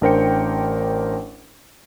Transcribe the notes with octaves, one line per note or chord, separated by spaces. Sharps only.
A1 D4 A#4 C5 G5 C#7